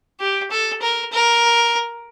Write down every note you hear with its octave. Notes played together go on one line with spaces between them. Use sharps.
G4
A4
A#4
A#4